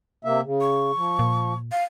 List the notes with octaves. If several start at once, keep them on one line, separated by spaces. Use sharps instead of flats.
C3 A#3 E5
C#3
C#6
F3
A#2
F5